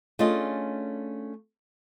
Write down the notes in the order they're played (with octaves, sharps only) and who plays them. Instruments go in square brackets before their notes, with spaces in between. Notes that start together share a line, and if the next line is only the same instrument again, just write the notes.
[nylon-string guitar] A3 C#4 D4 F4 G#4 D#5